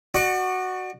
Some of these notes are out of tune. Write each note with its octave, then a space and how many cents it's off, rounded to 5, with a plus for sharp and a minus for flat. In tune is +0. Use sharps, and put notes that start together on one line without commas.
F#4 +0 D5 +35 C#6 +5